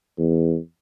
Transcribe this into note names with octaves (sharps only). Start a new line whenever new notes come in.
E2